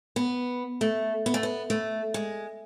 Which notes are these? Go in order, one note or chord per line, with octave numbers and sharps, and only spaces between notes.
B3
A3
B3
A3
B3
A3
G#3